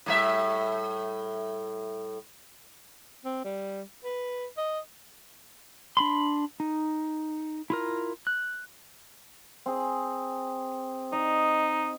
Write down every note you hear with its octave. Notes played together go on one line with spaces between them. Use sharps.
A2 G3 E5
C4
G3
B4
D#5
D4 B5 C6
D#4
E4 F4 A#4
F#6
C4 G#4
D#4 D#5